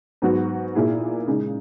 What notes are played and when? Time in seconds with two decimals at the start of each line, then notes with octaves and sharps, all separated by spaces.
0.22 G#2 F#3 B3 F#4
0.75 A#2 A#3 E4 G#4
1.27 C#3 G#3 D#4